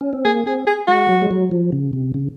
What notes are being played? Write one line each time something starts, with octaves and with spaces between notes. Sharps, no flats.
C#4
C4
A#3 G#4
C4 G#4
G#4
G#3 F#4
F#3
G#3
F#3
F3
C#3
C3
C#3